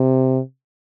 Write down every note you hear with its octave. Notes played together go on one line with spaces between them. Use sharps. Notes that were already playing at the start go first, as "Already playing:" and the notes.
Already playing: C3